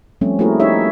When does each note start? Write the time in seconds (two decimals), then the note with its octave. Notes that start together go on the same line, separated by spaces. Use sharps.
0.21 F3 G3 A3 C4 C#4
0.39 A3 A#3 E4 F#4 G#4 A#4
0.60 D#4 G4 C#5 E5